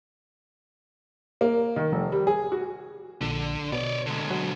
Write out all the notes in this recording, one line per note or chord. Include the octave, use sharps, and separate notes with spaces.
A#3
D#3
F1
G3
G#4
F#4
A#1 D3
B2 C#5 D5
D3 G#3
F#3